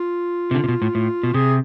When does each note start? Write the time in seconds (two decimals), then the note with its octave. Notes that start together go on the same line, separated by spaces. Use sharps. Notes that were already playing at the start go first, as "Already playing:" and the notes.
Already playing: F4
0.51 C3
0.55 D3
0.64 C3
0.68 B2
0.82 A2
0.95 A2
1.23 B2
1.34 C3 G#4